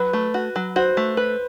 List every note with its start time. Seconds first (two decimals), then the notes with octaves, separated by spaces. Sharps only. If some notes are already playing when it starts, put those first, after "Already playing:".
Already playing: F#3 B4
0.13 A3
0.34 F#4
0.56 F#3
0.76 F#4 C5
0.97 A3
1.17 B4